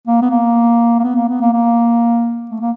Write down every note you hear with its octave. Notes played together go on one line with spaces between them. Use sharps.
A#3
B3
A#3
A#3
B3
A#3
B3
A#3
A#3
A3
A#3